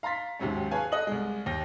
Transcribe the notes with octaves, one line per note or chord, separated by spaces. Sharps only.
F5 A#5 C6 A6 B6
D#2 G#2 C3 F#3 C#4
G#4 B4 C#5 F5 G#5 A5
A4 D#5 D#6 F#6 F#7
C2 G#3
D#2 G5 A#6